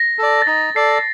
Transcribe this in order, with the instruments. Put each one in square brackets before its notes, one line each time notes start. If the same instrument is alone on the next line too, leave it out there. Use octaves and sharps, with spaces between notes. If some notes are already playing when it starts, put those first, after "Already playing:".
Already playing: [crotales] A#6
[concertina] A4 D5
[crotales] A6
[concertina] D#4 [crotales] A#6
[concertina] A4 D5 [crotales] C7